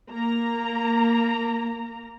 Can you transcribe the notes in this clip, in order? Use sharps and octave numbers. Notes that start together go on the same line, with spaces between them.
A#3 A#5